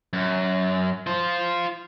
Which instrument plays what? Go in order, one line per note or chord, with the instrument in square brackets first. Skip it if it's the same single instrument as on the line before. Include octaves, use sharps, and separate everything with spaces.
[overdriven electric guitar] F#2
F4 C5